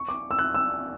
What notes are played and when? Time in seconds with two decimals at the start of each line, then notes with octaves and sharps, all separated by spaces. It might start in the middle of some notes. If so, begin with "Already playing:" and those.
Already playing: C#6
0.09 D6
0.31 E6
0.39 F#6
0.54 E6